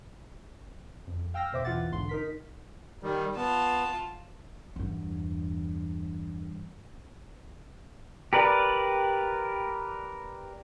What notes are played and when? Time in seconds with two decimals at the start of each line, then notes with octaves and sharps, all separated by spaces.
1.07 F2
1.34 F5 G5 E6 F6 A#6
1.52 E2 B2 C5 E5 D6
1.65 E2 E3 F4 F5 F#5 A6
1.91 B1 G#2 D3 C6
2.09 D#4 A#4 B6
3.03 D#3 G3
3.36 B3 F4 A5
4.76 E2 G2
8.33 G4 A#4 B4 D5